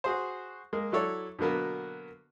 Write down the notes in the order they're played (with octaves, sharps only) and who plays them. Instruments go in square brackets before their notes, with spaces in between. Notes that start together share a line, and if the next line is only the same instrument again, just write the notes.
[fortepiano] F#4 G#4 C5
G#3 A#3
F#3 E4 A4 C#5 D5
B2 D3 F#3 A#3 B3